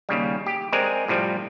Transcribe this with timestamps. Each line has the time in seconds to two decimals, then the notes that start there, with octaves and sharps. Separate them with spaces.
0.09 D#2 C#3 G3
0.46 G4
0.72 G#3 C4 A#4 D5 G#5
1.08 A2 C3 F3 G3